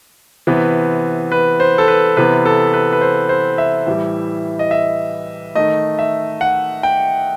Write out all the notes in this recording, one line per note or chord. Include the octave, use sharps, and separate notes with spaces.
C3 E3 B3
B4
C5
A4
B4
C3 E3 B3 B4
A4
B4
B4
C5
C5
E5
A2 E3 G3
D#5
E5
D#3 A3 D#5
E5
F#5
G5